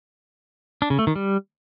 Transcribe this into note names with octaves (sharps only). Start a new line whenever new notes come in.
D4
C#3
A3
D#3
G3